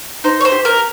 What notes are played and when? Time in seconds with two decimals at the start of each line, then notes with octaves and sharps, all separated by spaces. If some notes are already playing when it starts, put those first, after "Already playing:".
0.24 D#4 C5
0.41 C#5
0.45 C5
0.52 G4
0.65 A#4